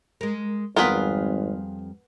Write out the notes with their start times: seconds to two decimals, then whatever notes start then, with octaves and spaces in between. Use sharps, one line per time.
0.21 G#3 A#4
0.76 G#1 F2 G3 B3 F4 G#4 A#4 B4